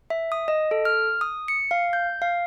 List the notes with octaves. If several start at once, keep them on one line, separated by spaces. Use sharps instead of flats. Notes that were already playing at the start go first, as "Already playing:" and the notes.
E5
D#6
D#5
A4
F6
D#6
C#7
F5
G6
F5